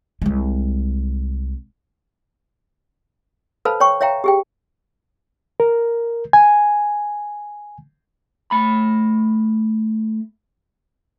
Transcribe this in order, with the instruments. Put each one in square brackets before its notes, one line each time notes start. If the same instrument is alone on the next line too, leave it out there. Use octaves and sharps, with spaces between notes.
[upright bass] C2 G#3
[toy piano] A4 B4 C5 F5 A5 B5
C#5 G5 C#6
C#5 E5 F5 G5 A#5
G4 G#4 G5
[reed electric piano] A#4
G#5
[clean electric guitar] A3 B5